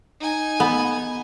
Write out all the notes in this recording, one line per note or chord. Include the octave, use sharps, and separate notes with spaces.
D#4 G#5
B3